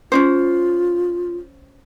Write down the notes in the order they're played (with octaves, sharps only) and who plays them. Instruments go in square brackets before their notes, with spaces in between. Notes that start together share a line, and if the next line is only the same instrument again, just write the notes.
[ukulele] C#4 D#4 C5 [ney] F4